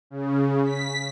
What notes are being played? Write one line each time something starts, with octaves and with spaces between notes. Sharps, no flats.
C#3
B6